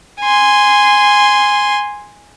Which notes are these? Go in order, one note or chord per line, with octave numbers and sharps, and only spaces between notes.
G#5 C6